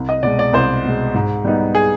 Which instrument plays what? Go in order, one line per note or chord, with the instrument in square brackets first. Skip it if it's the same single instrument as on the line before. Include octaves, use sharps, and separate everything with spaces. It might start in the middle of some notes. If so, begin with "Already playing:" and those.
Already playing: [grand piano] C2
D#5
B2 G#3 D5
D5
C2 C5
B2 G#3
G#2
G3 B3 D#4
G#4